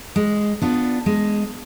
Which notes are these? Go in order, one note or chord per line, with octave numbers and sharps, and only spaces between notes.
G#3
B3 D4 F4
G#3